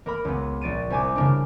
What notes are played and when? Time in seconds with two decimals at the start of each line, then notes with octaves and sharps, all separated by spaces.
0.06 A#3 A#4 B5
0.25 C#2 B3
0.61 A#1 A6 D7 D#7
0.90 C2 G#5 D6
1.16 C#3 A#3 D4